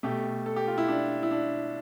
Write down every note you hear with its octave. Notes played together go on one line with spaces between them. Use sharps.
B2 A3 G4
A4
G4
F4
E4
D4
E4
D4